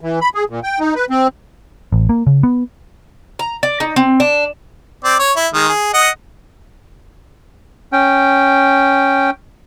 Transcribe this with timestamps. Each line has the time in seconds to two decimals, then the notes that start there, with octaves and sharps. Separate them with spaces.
0.01 E3
0.21 B5
0.34 G#4
0.50 A#2
0.64 G5
0.80 D#4
0.95 B4
1.10 C4
1.92 A1
2.09 A#3
2.27 C#3
2.43 B3
3.39 A#5
3.63 D5
3.80 D#4
3.96 C4
4.20 D4
5.04 C4 D5
5.19 C#5
5.36 E4
5.54 D#3 G#3
5.69 G#4
5.94 D#5 F#5
7.93 C#4 G5